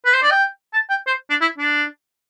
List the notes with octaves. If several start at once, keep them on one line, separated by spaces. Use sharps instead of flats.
B4
C5
D5
G5
A5
G5
C5
D4
E4
D4